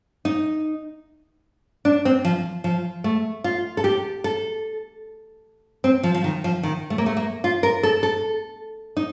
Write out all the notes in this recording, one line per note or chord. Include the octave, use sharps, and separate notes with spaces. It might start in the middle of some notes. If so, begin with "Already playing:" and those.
D#4
D4
C4
F3
F3
A3
F4
A4
G4
A4
C4
F3
F3
D#3
F3
D#3
A3
A#3
A3
A#3
F4
A#4
A4
A4
D#4